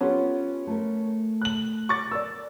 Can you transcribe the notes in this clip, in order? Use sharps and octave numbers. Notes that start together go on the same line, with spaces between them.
B3 C#4 F4 G4 A4
A3 A#4
F#6 F#7
C#6 D6 A6
A#4 D5 E6